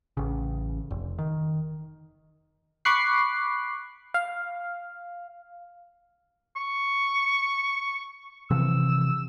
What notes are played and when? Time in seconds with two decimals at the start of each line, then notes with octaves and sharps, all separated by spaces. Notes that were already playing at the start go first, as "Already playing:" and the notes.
0.17 A1 C#3
0.91 F1
1.19 D#3
2.85 B5 C#6 D6 F#6 C7
4.14 F5
6.56 C#6
8.50 C3 E3 F3 E6